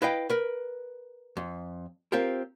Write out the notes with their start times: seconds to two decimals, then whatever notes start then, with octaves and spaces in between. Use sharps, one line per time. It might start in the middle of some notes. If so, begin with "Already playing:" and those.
0.02 E4 B4 D#5 F5 G5
0.30 A#4 B4
1.37 F2
2.12 C4 F4 G4 A#4